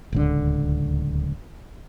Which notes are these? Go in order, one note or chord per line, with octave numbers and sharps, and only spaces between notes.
D1 C#2 D3